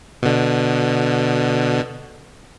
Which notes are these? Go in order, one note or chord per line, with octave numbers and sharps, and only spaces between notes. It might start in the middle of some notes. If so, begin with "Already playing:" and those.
B2 D3